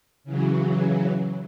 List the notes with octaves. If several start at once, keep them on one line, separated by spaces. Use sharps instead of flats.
C#3 E3 F#3